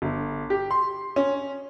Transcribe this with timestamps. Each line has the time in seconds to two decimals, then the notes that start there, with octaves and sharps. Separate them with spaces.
0.02 G1
0.50 G4
0.71 C6
1.16 C#4